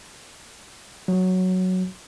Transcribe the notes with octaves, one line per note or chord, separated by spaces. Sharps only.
F#3